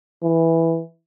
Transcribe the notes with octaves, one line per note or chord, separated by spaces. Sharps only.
E3